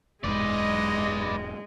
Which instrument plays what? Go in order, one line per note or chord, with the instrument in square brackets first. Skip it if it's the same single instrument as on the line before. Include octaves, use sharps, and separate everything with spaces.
[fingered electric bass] E1 G#2 [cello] G#3 [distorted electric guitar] B4 D5 [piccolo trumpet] D#5